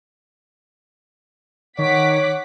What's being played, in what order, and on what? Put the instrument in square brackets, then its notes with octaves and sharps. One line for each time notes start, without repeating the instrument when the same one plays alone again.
[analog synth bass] D#3 [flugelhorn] C#5 [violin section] F#5 D6 B6